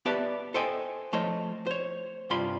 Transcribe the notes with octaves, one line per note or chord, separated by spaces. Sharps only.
B3 G4 B4 D5 E5 A5
A4 C5 D#5 G5 G#5
F3 A3 C5 C#5 D#5
C5 C#5
C2 G2 G3 F4 B5 C6